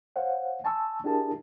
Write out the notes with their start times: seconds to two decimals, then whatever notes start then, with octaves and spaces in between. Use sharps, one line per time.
0.16 C5 C#5 F5 F#5
0.64 G#5 A5 C6 C#6 E6
1.04 D4 E4 G4 G#4 A#4 A5